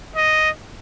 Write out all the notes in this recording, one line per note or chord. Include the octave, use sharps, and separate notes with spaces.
D#5